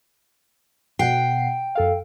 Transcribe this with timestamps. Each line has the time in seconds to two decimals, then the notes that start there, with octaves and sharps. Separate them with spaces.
0.99 B2 F#5 G5 C7
1.75 F#2 A4 F5